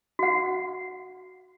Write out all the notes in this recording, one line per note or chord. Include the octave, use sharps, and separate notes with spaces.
F#4 F#5